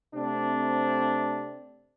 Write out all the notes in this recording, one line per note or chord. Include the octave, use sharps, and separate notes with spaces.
C3 A3 C4 D4